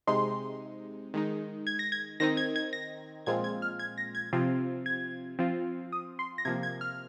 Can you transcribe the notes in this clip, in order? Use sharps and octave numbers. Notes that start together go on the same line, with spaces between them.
C3 G#3 D#4 C6
D#3 G#3 D#4
G#6
A#6
G#6
D#3 C4 D#4 A#6
G#6
G#6
A#6
A#2 F3 G#3 C4 F4 G#6
G#6
F6
G#6
A#6
G#6
C3 F3 C4 F4
G#6
F3 C4 F4
D#6
C6
A#6
C3 F3 A#3 G#6
G#6
F6